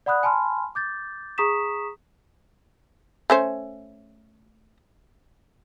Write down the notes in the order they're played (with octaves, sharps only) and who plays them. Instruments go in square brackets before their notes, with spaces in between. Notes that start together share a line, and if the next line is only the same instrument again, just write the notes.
[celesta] D5 F#5 B5 D#6 F#6
G#5 A5 B5 C6 F6
D6 G6 A6
G#4 A#5 C#6 D#6 B6 E7
[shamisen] A3 C#4 C5